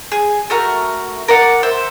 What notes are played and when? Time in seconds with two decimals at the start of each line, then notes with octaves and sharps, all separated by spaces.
0.12 G#4
0.50 A3 F#4 A#4
1.28 A#4 D5 F#5
1.63 C5 E5